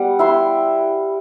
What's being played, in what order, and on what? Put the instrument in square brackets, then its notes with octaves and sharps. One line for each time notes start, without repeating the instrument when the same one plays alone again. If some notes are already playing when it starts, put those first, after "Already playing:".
Already playing: [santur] G3 B3 F#5
E4 C6